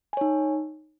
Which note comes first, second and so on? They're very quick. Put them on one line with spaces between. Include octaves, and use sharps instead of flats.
G#5 C#5 D#4